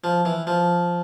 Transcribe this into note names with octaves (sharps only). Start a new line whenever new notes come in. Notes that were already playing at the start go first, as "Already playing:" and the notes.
F3
E3
F3